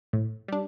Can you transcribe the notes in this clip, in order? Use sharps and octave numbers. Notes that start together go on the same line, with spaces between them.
A2
G3 D4